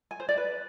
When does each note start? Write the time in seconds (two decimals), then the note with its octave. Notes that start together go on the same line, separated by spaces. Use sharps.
0.11 G#5
0.20 C5
0.29 D5
0.37 B4